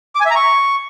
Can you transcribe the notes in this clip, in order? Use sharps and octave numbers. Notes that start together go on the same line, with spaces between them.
D6
G#5
E5
A#5
C#6